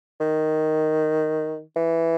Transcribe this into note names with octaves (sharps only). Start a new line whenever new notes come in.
D#3
E3